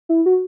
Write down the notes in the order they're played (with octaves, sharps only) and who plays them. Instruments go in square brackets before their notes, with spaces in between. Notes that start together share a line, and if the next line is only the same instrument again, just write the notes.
[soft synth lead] E4
F#4